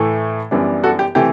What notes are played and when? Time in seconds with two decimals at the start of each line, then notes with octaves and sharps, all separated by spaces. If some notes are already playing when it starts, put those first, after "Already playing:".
Already playing: A2 E3 A3
0.51 F#2 E3 G3 B3 D4
0.84 F#4 A4
0.99 G4
1.15 C3 E3 A3 G4